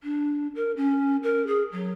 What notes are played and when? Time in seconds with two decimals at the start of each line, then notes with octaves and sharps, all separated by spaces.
0.03 D4
0.55 A#4
0.77 C#4
1.23 A#4
1.47 G#4
1.72 F#3